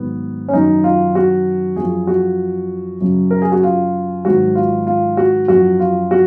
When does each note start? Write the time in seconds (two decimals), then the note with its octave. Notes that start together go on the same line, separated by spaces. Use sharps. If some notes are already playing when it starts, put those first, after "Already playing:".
Already playing: G#2 D#3 F#3 B3
0.48 C#4
0.53 F#2 D#3 F#3 D#4
0.84 F4
1.15 F#4
1.76 F#2 F3 G#4
2.07 F#4
3.01 F#2 C#3 F#3
3.31 A#4
3.42 G#4
3.52 F#4
3.63 F4
4.25 G#2 D#3 F#3 F#4
4.55 F4
4.87 F4
5.17 F#4
5.48 F#2 F#4
5.54 F3
5.80 F4
6.11 F#4